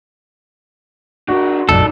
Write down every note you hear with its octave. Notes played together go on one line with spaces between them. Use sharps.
D4 F#4 A#4
F1 A#1 F#2 D#4 A4 D5